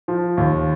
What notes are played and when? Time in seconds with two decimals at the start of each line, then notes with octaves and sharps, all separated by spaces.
0.08 F3
0.37 D#2